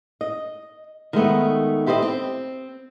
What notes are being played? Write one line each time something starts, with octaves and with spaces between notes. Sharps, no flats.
D#5
D#3 G#3 A3 B3
E4 G4 C5 C#5 D#5
C4